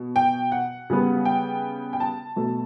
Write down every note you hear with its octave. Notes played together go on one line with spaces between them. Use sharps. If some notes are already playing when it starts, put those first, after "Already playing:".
Already playing: B2
G5
F#5
C#3 G3 B3
G5
G5
A5
B2 F#3 A3